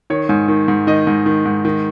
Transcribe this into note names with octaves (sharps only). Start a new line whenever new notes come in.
D#3 C#5
G#2
D#3
G#2
D#3 D#5
G#2
D#3
G#2
D#3